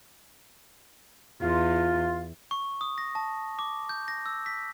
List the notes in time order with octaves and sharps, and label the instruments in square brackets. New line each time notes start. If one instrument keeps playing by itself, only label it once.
[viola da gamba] E2 [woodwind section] F4
[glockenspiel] C#6
D#6
A#6
A5
D6
G6
A#6
E6
B6